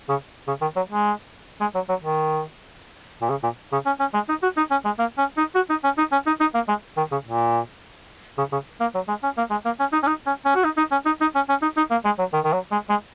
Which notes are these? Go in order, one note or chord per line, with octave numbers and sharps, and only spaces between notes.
C#3
C#3
D#3
F#3
G#3
G#3
F#3
F#3
D#3
A#2
C#3
A#2
C#3
C#4
C#4
G#3
D#4
F#4
D#4
C#4
G#3
A#3
C#4
D#4
F#4
D#4
C#4
D#4
C#4
D#4
D#4
A#3
G#3
D#3
C#3
A#2
C#3
C#3
A#3
F#3
G#3
C#4
A#3
G#3
A#3
C#4
D#4
C#4
D#4
C#4
C#4
F#4
D#4
D#4
C#4
D#4
D#4
C#4
C#4
D#4
D#4
A#3
G#3
F#3
D#3
D#3
F#3
G#3
G#3